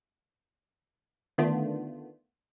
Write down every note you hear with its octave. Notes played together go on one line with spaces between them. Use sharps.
D3 D#3 A3 B3 D4 F4